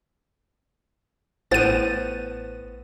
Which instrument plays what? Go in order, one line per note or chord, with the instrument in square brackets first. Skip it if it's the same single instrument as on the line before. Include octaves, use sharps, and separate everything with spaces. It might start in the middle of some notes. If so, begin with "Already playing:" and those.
[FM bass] A1 [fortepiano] A2 F#5 [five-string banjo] B3 C5 G5 [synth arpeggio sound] A6 D#7